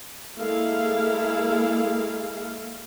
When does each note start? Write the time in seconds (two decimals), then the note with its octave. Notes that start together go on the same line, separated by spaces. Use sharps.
0.37 G#3 A#3 E4 G#4 A4 F5